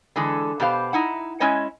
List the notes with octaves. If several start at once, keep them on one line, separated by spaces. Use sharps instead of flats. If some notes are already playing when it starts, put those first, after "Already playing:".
D3 E3 G#3 A4
B2 B3 G4 C5 F5
D#4 E4 F#5
G#3 C#4 E4 C#5 D#5